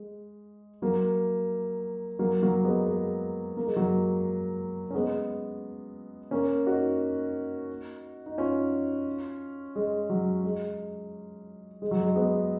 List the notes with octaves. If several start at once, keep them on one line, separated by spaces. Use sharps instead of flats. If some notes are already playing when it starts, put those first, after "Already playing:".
Already playing: G#3
F#3 A#3
F#3 A#3
F#3 A#3
G#3 B3
G#3
A#3
G#3
F#3 A#3
C#4
G#3 B3
A#3 C#4
D#4 F#4
D#4
C#4 F4
G#3
F#3
G#3
G#3
F#3
G#3
G#3 B3